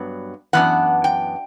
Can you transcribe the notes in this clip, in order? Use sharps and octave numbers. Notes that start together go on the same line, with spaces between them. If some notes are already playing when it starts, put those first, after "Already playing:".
Already playing: G2 F#3 B3
F#2 E3 B3 D4 F#5
G5